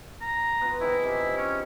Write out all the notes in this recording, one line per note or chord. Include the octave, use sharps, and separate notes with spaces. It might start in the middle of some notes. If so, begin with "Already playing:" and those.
A#5
B3 F4 B4
D#3 E4 G#4 C5
C3 F5
C#4